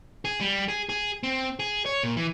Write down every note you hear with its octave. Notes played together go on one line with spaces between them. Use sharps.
G#4
G3
G#4
G#4
C4
G#4
C#5
A#2
E3